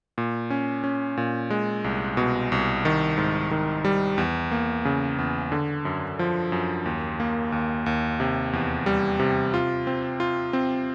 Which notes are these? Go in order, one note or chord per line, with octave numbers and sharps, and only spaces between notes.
A#2
C#4
C#4
A#2
G#3
C2
B2
C2
D#3
G#2
D#3
G3
E2
A#3
C#3
E2
D3
F#2
F3
F#2
D#2
A#3
D#2
D#2
C3
E2
G3
C3
F4
C4
F4
C4